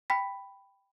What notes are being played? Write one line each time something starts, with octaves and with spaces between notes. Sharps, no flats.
G5 B5 B6